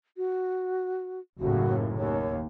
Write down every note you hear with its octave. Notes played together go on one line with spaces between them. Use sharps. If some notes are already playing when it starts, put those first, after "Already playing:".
F#4
F#1 D#2 A2 F#4
D#2 C#5